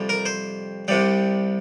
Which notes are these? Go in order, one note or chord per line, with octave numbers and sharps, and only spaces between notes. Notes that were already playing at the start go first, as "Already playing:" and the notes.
Already playing: F2 C3 G3
A#4
C5
C2 C3 G3